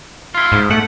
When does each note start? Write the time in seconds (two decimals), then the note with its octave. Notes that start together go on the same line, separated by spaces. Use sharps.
0.35 E4 F4
0.52 G#2
0.71 A3 F#5